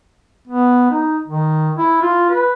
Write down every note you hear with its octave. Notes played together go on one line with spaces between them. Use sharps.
B3
D#4
D#3
E4
F4
B4